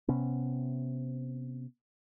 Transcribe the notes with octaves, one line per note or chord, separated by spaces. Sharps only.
C3 B3 C#4